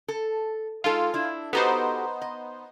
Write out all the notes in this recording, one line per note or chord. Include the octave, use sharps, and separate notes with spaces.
A4
G#3 D#4 F4 A4
D4 E4
B3 D#4 F#4 G4 A4 C5
D#5